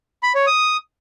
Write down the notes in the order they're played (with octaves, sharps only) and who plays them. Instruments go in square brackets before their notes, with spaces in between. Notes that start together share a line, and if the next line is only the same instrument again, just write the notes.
[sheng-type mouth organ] B5
C#5
D#6